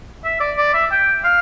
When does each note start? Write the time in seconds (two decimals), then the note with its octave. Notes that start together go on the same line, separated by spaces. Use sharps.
0.24 E5
0.40 D5
0.57 D5
0.74 E5
0.91 G5
1.24 F5